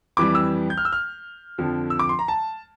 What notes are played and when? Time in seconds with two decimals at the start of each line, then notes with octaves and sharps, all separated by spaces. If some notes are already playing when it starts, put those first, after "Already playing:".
0.17 F2 E3 G3 D6
0.35 E6
0.70 G6
0.77 F6
0.85 E6
0.93 F6
1.58 F2 D3 F3
1.90 E6
1.99 D6
2.09 C6
2.19 A#5
2.28 A5